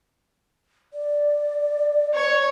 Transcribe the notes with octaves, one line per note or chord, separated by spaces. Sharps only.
D5
C#5